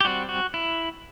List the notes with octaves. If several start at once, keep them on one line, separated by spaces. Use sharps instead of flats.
G4
G3 C4 F#4
F#4
E4